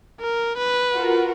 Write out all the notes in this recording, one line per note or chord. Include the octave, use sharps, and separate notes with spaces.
A#4
B4
F4 F#4 A#4